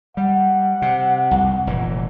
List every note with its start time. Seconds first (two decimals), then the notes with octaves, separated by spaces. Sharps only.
0.17 G3 F#5
0.82 C3
1.31 C2 F2
1.67 F1 A#2 E3